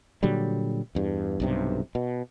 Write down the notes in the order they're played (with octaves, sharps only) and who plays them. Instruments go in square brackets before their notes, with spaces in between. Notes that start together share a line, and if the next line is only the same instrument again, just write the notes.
[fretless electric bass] A#2 D3 F#3 G3
E2 G2
B1 G2 C3
B2